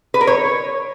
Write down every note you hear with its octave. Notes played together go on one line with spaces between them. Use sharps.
B4
A#4
C#5